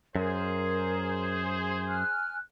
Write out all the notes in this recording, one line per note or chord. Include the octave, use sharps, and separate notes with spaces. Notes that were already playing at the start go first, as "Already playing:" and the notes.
F#2 G#4 A#4 C5
G#5 F6 F#6